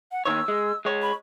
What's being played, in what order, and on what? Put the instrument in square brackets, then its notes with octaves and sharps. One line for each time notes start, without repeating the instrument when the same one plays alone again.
[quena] F#5
[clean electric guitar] D#2 D#3 C#5 [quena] E6
[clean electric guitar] G#3
G#3 C#5
[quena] B5